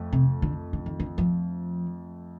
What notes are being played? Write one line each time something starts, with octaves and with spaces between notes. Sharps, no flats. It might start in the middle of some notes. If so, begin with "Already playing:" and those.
Already playing: F2 A3
C3
D3
D3
D#3
D3
F3